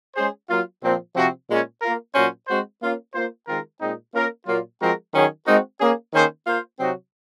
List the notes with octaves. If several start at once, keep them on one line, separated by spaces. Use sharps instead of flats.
G#3 C#4 G#4 C5
F#3 A#3 F4
A#2 F3 C4
C3 F3 C4 F#4
A#2 G#3 C#4
A#3 F4 A#4
A#2 F#3 C#4 F#4 C5
G#3 C4 F#4 C5
A#3 C#4 F4
A#3 F4 C5
D#3 G#3 C4 F4 A#4
A#2 G#3 C4 D#4
A#3 C#4 F4 A#4
A#2 F#3 A#3 F4
F3 G#3 C4 F#4 A#4
D#3 F#3 C#4 G#4
G#3 C4 D#4 F#4 A#4
A#3 C#4 G#4
D#3 A#3 C#4 G#4 C5
A#3 F4 C5
C3 F#3 C4 D#4 F#4